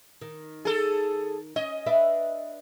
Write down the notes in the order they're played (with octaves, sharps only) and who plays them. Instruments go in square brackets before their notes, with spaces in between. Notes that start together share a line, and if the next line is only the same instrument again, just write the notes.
[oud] D#3
[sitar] G#4 A4
[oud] C#4 [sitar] D#5
[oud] D4 B4 E5